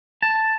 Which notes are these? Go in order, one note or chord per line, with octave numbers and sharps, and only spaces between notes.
A5